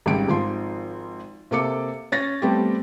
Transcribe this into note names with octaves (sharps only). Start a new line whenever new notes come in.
G#1 C#3 G3 D7
G#1 F3 C6
C3 A#3 A4 D6 C#7
C#4 A6 A#6
G3 A3 B3 C4 G4